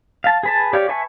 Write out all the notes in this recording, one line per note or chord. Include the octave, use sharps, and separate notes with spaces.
F5 A5
G#4 B4 A5
G4 C#5 D5 F5
B4 E5 G#5 A5 C#6